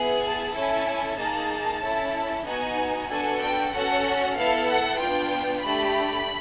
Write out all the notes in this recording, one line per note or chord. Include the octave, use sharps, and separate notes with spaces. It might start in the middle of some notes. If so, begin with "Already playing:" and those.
Already playing: B3 E4 G#4
A5
C#4 E4 A4 G#5
A#3 D#4 G#4 A5
C#4 E4 A4
B3 D#4 F#4 G#5
B3 D4 F#4 A4 G#5
G5
C#4 F#4 A4 F#5
B3 E4 A4 F5
F#5
B3 D4 F4 G5
A3 D4 G4 B5